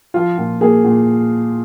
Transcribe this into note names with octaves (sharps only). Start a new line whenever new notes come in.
F3 F4
A#2
A#3 G#4
A#2